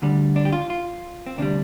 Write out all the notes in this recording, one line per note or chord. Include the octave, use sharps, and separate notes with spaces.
D2 D3 G3
D4
G4
F4
F4
C4
D2 C3 G3 D4